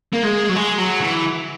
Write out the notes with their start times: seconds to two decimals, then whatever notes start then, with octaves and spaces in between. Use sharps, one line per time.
0.13 A#3
0.23 G#3
0.49 F#3
0.56 G#3
0.78 F#3
1.00 E3